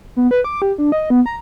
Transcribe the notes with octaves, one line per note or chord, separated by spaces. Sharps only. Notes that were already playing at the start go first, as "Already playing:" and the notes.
B3
B4
D6
G4
D4
D#5
B3
A#5